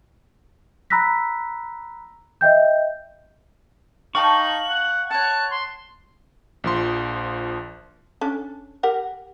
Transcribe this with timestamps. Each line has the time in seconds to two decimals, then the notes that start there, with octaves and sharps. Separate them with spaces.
0.90 A#5 B5 E6 F#6 A#6 B6
2.41 D#5 E5 G5 G6
4.15 D#4 F5 G5 A5 C#6 F#7
4.68 F#5
5.11 C#5 F#5 A5 F#6
5.51 C6
6.64 A#1 F3 C6
8.21 C#4 D4 A4
8.83 G4 A#4 F#5